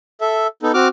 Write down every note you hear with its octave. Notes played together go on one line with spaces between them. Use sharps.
A4 E5
B3 D#4 A4
C4 F#4 D6 F6